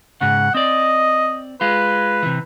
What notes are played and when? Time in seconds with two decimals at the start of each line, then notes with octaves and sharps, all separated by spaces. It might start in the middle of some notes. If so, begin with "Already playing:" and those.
0.21 G#2 C#3 F#5
0.55 C4 D5 D#5
1.61 G#3 F4 B4
2.23 C3 E3